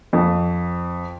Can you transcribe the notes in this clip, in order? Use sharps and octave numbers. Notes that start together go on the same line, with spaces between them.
F2